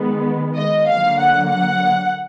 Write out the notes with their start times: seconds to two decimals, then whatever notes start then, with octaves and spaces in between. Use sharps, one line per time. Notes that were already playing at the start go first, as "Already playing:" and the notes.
Already playing: D#3 G#3 B3
0.56 D#5
0.87 D3 F#3 A#3 F5
1.19 F#5
1.51 F#5